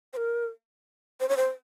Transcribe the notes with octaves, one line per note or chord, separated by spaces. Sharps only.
C5
A#4
C5
C#5
C5